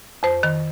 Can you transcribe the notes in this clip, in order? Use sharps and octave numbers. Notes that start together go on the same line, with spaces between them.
F2 C5
D#3